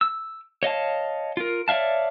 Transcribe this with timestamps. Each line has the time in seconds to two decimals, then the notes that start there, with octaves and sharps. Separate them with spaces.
0.01 E6
0.63 C#5 D#5 F5 A5
1.37 F4 A#4
1.68 C#5 D5 E5 F5 A5